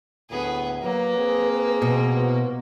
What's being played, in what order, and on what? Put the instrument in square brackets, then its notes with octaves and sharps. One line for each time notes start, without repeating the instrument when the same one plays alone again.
[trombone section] D2 A2 [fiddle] B3 G#4
[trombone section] F#3 [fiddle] A#3 [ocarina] B4
[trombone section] C4 G#4
[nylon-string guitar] B2
[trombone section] C2 F#4 C5 [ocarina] B4